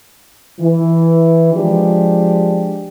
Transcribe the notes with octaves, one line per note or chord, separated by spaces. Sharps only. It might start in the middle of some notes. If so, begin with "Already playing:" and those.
E3
F3 G#3 D4 F4 G4